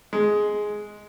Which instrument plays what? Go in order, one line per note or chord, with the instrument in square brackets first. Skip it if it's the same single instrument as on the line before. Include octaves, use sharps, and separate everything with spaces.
[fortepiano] G#3